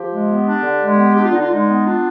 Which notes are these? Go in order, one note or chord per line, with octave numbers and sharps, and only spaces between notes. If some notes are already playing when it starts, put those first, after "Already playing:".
Already playing: F3 G4
G#3
B3
D4
D3
G#3
B3
D4 G4
F4
D3 D#4
F4
G#3 D#4
B3
D4 F4